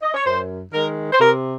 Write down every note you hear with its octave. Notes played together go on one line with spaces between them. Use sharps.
D#5
C#5
F#2 C5
D#3 G#3 A#4
C5
C3 A#4